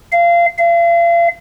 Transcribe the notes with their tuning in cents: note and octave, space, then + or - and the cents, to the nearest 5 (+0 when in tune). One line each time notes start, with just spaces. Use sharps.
F5 -25
F5 -40